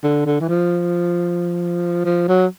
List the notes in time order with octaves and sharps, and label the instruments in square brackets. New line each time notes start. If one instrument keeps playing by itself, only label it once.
[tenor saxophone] D3
D3
E3
F3
F3
F#3